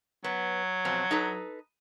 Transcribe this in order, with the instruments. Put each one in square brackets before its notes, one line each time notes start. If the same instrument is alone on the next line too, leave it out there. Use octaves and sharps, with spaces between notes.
[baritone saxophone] F#3 [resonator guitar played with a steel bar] B3
[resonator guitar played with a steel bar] F2 B2 C4
D#4 A4 B4